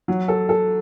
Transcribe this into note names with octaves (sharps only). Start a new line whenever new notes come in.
F#3
A4
A4